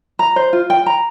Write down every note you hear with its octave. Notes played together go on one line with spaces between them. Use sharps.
A#5
C5
F4
G5
A#5